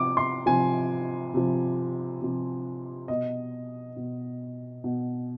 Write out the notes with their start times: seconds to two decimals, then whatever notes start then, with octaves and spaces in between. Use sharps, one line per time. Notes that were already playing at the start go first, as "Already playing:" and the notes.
Already playing: C3 F3 D6
0.17 C6
0.46 C3 F3 G#5
1.34 C3 F3
2.22 C3 F3
3.08 B2 D#5
3.97 B2
4.84 B2